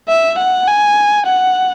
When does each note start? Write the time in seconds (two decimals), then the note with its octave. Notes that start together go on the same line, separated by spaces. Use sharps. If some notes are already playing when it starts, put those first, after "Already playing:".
0.08 E5
0.38 F#5
0.67 G#5
1.26 F#5